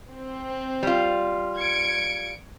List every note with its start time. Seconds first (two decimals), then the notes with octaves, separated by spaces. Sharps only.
0.10 C4
0.83 G3 F4
1.57 G#6 C#7 D7